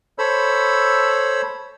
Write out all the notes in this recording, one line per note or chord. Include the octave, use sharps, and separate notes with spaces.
A4 C5 C#5 B5 E6